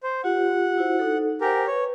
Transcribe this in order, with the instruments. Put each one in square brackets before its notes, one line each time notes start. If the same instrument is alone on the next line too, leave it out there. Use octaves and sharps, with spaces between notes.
[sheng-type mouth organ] C5
[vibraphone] F4 G4 [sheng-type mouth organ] F#5
[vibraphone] E4 F#4 C5
D#4 A4
[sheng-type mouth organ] G4 A#4 [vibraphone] C5 F#5 G#5
[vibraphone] B4 [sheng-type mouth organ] C#5